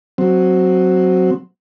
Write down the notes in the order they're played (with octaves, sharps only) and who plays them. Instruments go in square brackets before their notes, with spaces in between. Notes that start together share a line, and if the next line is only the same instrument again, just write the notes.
[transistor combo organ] F#3 C4